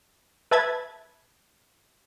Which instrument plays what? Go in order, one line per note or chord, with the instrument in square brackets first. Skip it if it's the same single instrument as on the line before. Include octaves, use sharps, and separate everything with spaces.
[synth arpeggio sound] B4 E5 A5 B5 G#6 A6